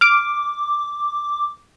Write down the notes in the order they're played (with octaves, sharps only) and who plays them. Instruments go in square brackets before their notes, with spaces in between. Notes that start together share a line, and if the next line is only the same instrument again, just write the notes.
[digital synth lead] D6 [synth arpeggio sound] F6 D7